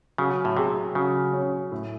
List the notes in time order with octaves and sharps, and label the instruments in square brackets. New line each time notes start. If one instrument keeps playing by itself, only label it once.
[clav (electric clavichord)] C#3 [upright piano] F#3
[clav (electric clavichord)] A2
[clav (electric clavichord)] C3 [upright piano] G#4
[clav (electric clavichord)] C#3 [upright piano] F#3
[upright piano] C#4
A2